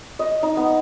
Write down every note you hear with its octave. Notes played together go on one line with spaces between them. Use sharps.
D#5
D#4
B3